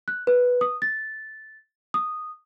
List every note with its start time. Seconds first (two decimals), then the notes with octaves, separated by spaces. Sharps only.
0.08 F#6
0.27 B4
0.61 D#6
0.82 A6
1.94 D#6